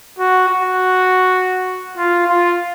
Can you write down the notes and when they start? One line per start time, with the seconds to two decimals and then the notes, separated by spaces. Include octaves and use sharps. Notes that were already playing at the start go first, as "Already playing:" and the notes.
0.19 F#4
0.48 F#4
1.97 F4
2.27 F4